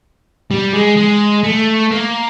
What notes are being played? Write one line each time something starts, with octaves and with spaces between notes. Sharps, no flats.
G3
G#3
G#3
A3
A#3